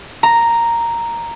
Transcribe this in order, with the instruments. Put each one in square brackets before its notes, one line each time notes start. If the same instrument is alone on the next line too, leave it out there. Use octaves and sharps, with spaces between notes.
[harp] A#5